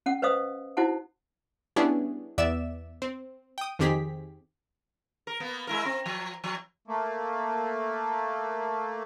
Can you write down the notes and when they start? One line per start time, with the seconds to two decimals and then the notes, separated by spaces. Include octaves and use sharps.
0.06 C#4 F#5
0.22 B4 C5 D#5 F5 D#6
0.77 D#4 E4 F#4 C5 F#5 A5
1.76 G3 B3 C#4 D4 E4 G#4
2.38 E2 B3 D5 E5 E6 E7
3.02 C4
3.58 G5 D#6
3.79 F2 D#3 C4 G4 G#4 B6
5.27 A#4
5.40 A#3 B3
5.67 G#3 E4 A#4
5.85 C4
6.06 F3
6.44 F3
6.88 A3 A#3